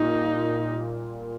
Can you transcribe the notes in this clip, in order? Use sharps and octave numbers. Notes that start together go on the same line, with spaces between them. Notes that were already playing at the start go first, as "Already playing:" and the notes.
Already playing: A#2 G3 A#3 D#4 F4